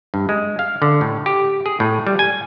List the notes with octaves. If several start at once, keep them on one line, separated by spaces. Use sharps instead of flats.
G2
G#3
F5
D3
A2
G4
G#4
A2
G3
G#5